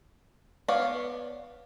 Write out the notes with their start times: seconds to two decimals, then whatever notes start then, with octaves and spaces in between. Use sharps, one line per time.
0.68 B3 B4 C#5 D5 F5